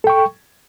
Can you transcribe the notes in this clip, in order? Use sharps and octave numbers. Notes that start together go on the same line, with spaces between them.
A4 G5 C#6